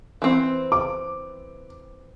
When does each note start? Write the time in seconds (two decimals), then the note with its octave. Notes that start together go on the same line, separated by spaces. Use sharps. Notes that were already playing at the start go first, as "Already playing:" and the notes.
0.22 E3 C4
0.72 D6